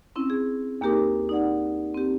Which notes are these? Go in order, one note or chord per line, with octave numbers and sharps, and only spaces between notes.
C4 C#4 E4
G#4
D#2 A#3 D#4 G4 A#4 D6
D#4 D5 F#5
C4 G4